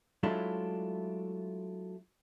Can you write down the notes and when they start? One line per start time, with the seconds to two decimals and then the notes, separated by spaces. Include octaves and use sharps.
0.23 F#3 G#3 A3 D4 E4 F4